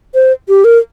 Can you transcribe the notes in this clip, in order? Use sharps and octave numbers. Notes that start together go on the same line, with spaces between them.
C5
G4
A#4